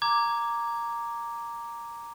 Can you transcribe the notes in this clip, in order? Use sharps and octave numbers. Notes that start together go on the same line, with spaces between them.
A#5 D6 G#6